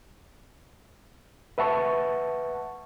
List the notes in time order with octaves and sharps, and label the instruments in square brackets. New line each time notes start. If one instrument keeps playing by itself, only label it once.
[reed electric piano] B4 E5 F#5 A5 C#6